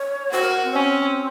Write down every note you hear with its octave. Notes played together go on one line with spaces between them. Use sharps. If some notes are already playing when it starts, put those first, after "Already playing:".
Already playing: C#5
F#4 C5
A#4
C4
C#4